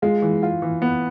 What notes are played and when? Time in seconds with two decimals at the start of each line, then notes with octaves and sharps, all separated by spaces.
0.02 G#3 F4
0.22 E3
0.43 F4
0.62 E3
0.82 B3